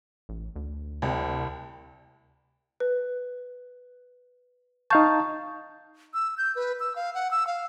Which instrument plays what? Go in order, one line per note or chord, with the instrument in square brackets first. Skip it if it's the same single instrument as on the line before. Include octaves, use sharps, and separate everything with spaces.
[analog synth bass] A1
D2
[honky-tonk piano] C2
[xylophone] B4
[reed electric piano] D#4 F5 A5 [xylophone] C#6 G6
[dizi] E6
G6
B4
E6
F5
F#5
E6
F5